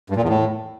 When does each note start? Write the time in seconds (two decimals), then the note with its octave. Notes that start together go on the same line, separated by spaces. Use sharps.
0.10 G2
0.16 A#2
0.22 E2
0.29 A2